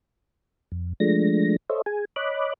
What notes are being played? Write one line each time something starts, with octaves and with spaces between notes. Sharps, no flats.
F2
F3 G#3 A3 D4 A#6
A4 C5 C#5 D#5 E5
G#4 G#5
C#5 D#5 B5 D6 F#6